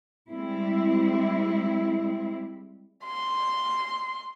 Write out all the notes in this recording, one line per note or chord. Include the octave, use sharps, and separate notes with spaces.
G3 G#3 C4 E4
C6